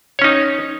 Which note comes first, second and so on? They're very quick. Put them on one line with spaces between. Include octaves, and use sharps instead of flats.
C#5 C#4 D#4